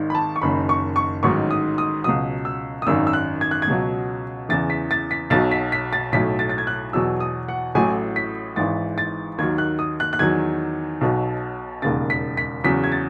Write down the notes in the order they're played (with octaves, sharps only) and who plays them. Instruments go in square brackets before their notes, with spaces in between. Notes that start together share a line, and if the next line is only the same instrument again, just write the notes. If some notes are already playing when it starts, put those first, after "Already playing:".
Already playing: [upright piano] G#1 G#2 D#3
B5
A5
C#6
F#1 F#2 D#3 B5
C#6
C#6
A1 G#2 D#3 F#3 C#6
D#6
D#6
C#2 B2 F#3 D#6
E6
D#6
G#1 F#2 D#3 E6
E6
F#6
G#6
F#6
G#6
C#2 B2 F#3
E2 C#3 E3 A6
B6
A6
B6
B1 B2 F#3 A6
B6
B6
A6
B1 A2 F#3 B6
A6
A6
G#6
F#6
E2 B2 F#3 E6
D#6
F#5
A1 A2 F#3 G#5
B6
G#1 G#2 E3 A6
A6
D#2 D#3 F#3 G#6
F#6
D#6
F#6
F#6
E2 D#3 F#3 G#6
B1 B2 F#3
E1 D#2 C#3 A6
B6
B6
E2 C#3 F#3 B6
G#6
A6